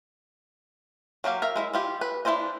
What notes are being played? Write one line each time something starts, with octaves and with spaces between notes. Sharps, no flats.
F#3 A#3 G4 F5
A#4 E5 F5
G#3 E4 E5
E4 F4 G4
B4
D4 E4 F4 C5 D#5